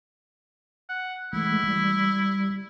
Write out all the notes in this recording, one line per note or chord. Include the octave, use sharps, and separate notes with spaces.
F#5
E3 G#3 A3 E4
G3